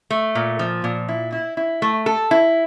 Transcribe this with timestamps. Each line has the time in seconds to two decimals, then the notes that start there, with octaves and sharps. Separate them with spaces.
0.10 A3
0.35 A#2
0.59 F3
0.84 A#2
1.08 E4
1.32 E4
1.57 E4
1.82 A3
2.06 A4
2.31 E4